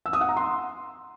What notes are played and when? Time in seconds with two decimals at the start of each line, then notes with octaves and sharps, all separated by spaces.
0.06 E6
0.13 D#6
0.21 F#5
0.29 A#5
0.37 C6